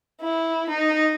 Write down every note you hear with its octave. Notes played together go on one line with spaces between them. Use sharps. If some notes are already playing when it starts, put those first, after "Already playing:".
E4
D#4